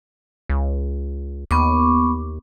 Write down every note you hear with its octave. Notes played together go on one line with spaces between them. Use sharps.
C#2
D#2 B3 C#6 D6